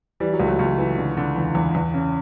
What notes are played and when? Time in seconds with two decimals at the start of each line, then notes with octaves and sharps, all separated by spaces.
0.20 E3 G3
0.33 F#3
0.40 C#2
0.46 F#3 A3
0.59 C#2
0.78 E3
0.98 D3
1.17 D3
1.36 E2
1.55 E2
1.75 E2
1.94 C#3